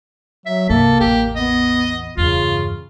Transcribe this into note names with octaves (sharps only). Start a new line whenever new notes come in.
F#3 E5
C2 G2 A#3 A4
A1 E2 G4
B3 D#5
E2 G2 C#3 F4